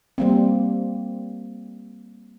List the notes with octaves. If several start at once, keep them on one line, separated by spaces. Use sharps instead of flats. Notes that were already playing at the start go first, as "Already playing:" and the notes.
G3 A#3 C4